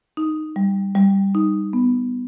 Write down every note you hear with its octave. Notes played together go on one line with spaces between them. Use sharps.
D#4
G3
G3
D#4
B3